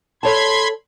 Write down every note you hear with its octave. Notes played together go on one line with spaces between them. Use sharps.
A4 C#5 A5 B5 C6 G#6